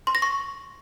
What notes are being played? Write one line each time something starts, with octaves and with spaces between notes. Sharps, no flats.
C6
A#6
C#6